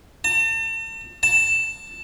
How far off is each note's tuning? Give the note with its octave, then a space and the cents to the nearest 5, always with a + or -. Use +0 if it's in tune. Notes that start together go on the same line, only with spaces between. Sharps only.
A5 +40
A5 +10